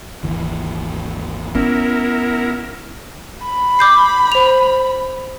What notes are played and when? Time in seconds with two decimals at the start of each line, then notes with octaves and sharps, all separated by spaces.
0.23 G#1 D#2 E3
1.55 B3 C#4 E4 A#4
3.45 B5
3.79 D6 G6 C7
4.32 C5 F7